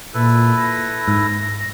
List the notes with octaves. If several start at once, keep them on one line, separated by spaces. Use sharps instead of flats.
A#2 E4 A4 B4
A#6
G#2